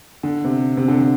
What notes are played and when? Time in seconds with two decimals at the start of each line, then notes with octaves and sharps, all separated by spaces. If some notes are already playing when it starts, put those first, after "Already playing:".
0.23 D3
0.44 C3
0.77 C3
0.88 D3
0.99 D3